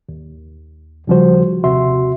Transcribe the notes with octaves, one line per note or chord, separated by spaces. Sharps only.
D#2
D#2 C#3 F3 G3 F#4 C5
D#2 C3 F#4 E5 C6